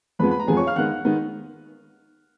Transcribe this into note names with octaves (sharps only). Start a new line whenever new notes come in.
F2 F3 G#3 B3 B4 B5
B5
A#5
F2 F3 G#3 B3 G#4 G#5
C#5 C#6
F5 F6
D#3 G#3 B3 D#4 F#5 F#6
D#3 G#3 B3 D#4